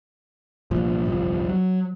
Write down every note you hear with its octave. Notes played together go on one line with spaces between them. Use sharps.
C2 A#2 F3
G1 C2 F2 F3
F#3